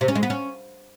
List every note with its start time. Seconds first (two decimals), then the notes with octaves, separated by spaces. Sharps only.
0.01 C3
0.08 C#4
0.15 G#3
0.23 B3
0.30 C#4